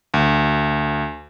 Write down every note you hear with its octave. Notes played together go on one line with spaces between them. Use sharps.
D2